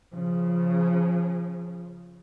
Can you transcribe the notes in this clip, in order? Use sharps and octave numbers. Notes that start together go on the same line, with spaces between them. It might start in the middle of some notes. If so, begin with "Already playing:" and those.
C#3 F3